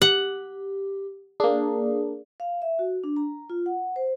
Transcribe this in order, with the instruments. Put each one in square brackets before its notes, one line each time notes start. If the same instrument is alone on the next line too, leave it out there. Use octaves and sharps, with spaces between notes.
[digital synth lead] G4 [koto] F#5
[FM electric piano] A#3 D4 [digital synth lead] G#4
[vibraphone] F5
E5
F#4
D4
A#5
F4
F#5
C5